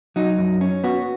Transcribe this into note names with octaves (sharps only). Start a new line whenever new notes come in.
F#3 D#4
F#2
C#4
B3 F#4